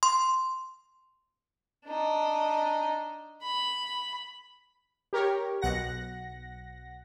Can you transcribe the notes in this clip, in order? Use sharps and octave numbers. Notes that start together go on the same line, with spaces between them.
C6
D4 D#4
B5
G4 A#4 C#5
B1 F#5 A#6